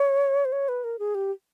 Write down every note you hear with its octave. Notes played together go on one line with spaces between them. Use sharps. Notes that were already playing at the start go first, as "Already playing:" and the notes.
Already playing: C#5
C5
C#5
B4
A#4
G#4
G4